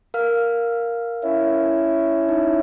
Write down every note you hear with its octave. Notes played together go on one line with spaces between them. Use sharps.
A#4 F5 F6
C#4 E4
D#4